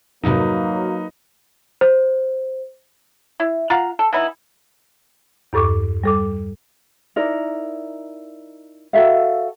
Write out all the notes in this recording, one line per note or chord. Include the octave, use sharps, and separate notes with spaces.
F2 G#2 C3 F#3 A#3 D#4 B4
C5
E4
F4 F5 F#5 A#5
A4
E3 B3 D#4 E4
E2 G2 A4 C#6 D6
G3 A4 D6
D#4 E4 A#4 D5
F#4 A4 E5 F5